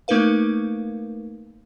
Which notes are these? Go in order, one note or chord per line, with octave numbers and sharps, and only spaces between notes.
A3 A#3 D#4 A#4 B4 F5